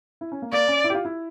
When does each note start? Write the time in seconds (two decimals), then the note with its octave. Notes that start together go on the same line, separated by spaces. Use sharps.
0.21 E4
0.32 C#4
0.42 A#3
0.53 A#3 D5
0.68 C#4
0.84 E4
0.90 G4
0.95 F4
1.05 E4